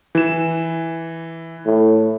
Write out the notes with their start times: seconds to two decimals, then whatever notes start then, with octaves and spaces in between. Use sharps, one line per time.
0.15 E3 E7
1.65 A2